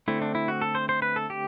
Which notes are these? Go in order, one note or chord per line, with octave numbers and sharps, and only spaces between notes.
D3 A3 C4 E4
D4
E4
F#4
A4
C5
C5
B4
A4
G4